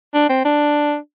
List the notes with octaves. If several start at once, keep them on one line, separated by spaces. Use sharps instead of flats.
D4
C4
D4